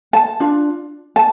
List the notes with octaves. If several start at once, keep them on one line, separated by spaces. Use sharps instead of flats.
A5
D4 F4
A5